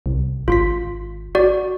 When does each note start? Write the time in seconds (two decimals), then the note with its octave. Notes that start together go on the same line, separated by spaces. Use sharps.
0.06 C2
0.48 G#1 F4 C6 B6
1.35 F#4 D5